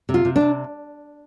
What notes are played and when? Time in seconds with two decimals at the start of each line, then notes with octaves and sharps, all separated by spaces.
0.09 C3
0.14 F4
0.25 C3
0.36 D4
0.41 C3